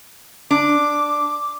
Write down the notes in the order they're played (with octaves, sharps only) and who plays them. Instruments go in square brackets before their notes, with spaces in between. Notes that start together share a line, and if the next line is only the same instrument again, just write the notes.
[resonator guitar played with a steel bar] D4 [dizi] D6